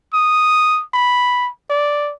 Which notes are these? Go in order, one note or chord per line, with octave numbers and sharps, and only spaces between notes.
D#6
B5
D5